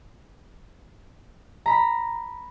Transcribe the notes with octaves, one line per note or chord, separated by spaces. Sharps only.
A#5 B5